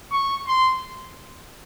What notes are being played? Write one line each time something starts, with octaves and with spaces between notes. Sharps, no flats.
C#6
C6